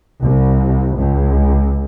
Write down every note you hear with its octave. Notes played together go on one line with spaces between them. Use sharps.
C2
C#2